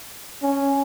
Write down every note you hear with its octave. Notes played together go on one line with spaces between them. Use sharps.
C#4